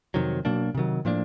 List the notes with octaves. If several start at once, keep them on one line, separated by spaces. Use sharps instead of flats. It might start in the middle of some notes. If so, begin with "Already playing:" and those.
F2 C3 D#3 F#3
B2 F#3 A#3 D4
C3 D#3 F#3
A2 F3 A#3 D4